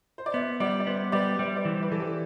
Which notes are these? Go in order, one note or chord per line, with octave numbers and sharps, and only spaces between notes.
C5
D5
B3 C5 E5
G3 D5 F#5
D5
B3 C5 E5
G3 B4 D5
G3 C5 E5
B4 D5
E3
C5
B4
E3 A4
G4 B4